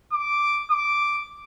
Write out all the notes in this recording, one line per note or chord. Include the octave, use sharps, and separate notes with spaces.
D6
D6